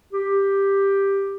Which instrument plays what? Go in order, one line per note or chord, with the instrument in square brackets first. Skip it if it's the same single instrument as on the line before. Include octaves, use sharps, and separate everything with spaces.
[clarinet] G4